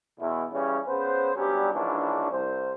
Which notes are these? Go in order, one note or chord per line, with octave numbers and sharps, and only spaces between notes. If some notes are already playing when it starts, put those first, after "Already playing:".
E2 B2 E4
C#3 E3 G3 C#4
C#3 B3 B4 C5
G2 F#3 G3 B3 C#4 G4
A#1 G#2 E3 C#4 D4
C2 C5